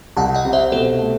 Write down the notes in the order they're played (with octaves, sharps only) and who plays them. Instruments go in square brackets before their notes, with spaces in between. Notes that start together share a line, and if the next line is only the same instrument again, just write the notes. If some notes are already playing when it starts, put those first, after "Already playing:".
[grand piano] C2 [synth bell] F#5 A5
[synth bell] D#5 F#5
[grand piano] C3
[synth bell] C5 E5
[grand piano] B2 [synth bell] A4 C5
[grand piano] A3